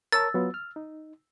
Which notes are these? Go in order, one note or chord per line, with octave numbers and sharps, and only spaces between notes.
A#4 C#5 A5 E6 A6
F#3 B3 F4
F6
D#4